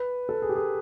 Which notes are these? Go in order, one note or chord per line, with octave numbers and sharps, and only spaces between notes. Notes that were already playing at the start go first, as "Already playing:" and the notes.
Already playing: B4
A4
G#4
G4
G#4